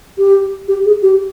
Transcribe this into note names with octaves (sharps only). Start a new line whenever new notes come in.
G4
G4
G#4
G4